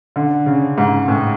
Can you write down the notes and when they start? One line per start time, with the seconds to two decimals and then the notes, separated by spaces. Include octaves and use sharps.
0.16 D3
0.46 C#3
0.78 G#2
1.08 A2